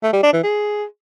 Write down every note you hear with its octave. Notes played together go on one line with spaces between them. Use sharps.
A3
G3
D4
E3
G#4